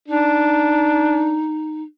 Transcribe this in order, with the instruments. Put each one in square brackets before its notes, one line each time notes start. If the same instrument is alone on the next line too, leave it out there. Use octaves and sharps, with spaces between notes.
[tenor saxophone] D4 [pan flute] D#4